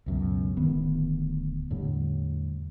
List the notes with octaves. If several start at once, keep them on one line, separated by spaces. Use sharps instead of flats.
C#2 F#2 B2
D1 D2 D#3 B3
E2 A2 D3 G3